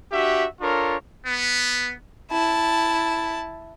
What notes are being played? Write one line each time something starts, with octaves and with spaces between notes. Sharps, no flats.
D4 F#4 G4 E5
D4 F4 A4 A#4 C#5
B3
E4 A5